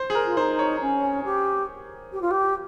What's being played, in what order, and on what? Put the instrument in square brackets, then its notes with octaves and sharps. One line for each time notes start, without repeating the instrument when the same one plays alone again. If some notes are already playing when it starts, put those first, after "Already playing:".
Already playing: [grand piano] C5
G#4
A#4
[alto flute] F4
[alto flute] D#4 [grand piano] C5
[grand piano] C#5
[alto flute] C#4
G4
G4
F4
G4